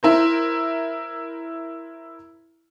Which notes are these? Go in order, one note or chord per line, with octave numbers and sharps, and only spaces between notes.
E4 A#4 C5